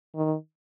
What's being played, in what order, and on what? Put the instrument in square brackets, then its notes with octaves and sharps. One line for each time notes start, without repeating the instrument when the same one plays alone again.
[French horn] D#3